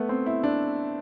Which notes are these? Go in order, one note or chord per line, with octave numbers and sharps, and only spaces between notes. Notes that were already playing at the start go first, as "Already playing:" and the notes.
Already playing: A3 B3
C4
E4
D4